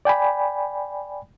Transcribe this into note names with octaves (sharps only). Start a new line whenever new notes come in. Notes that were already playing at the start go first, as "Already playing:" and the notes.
D5 G5 G#5 B5